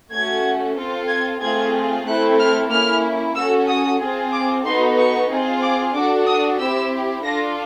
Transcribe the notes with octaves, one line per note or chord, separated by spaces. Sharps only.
A3 C#4 F#4 G#6
C4 F4 A4
G#6
A3 C4 F4 G#4 G#6
A3 C4 E4 A4 F#6
F6
A#3 C#4 E4 F6
C#4 F#4 A4 E6
D#6
C4 F4 G#4
D6
B3 D#4 F#4 A4 C6
C#6
C4 F4 G#4
D6
D4 F#4 A4 D6
D#6
C4 E4 G4 E6
D4 F4 A4 A#6